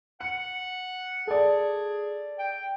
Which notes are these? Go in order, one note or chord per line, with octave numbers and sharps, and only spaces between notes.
F#5 C#7
G#4 A4 D5
G5